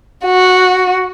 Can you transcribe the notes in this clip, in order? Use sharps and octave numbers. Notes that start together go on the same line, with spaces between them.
F#4